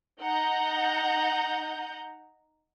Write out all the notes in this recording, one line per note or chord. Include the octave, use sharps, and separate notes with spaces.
D#4 F#5 A#5 G6